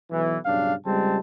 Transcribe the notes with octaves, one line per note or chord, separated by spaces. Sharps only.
B1 E3
B1 G2 C#3 D4 F5
C#2 G3 G#3 C4 A5